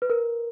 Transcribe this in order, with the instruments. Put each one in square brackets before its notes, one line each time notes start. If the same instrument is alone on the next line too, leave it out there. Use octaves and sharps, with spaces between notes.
[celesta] B4
A#4